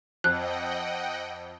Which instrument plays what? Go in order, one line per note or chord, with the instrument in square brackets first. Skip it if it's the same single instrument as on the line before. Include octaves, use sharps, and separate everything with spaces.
[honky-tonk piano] F2 [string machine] D#5 F#5 G5 [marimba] F#6